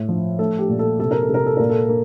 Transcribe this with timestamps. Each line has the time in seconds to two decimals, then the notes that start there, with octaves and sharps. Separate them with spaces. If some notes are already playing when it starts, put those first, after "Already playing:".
Already playing: A2
0.09 F3
0.39 A3 A4
0.59 G4
0.69 A#2
0.79 A4
0.99 C3 A4
1.11 A#4
1.23 A4
1.29 C3 A#4
1.46 A4
1.57 A#2 A#4
1.69 A4
1.89 A#3